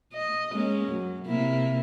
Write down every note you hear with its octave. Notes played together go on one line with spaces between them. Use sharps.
D#5
G#3 A#3 C#4
F#2
C3 A#3 E4